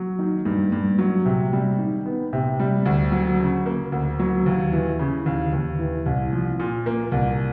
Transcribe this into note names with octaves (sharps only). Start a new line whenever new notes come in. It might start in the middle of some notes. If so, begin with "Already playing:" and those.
Already playing: F#3
D#3
G2
G2
F#3
C3
G3
D#3
B3
C3
G3
D2
F#3
C#3
A#3
D2
F#3
D#2
E3
C#3
D#2
D#2
E3
C2
F3
A#2
A#3
C2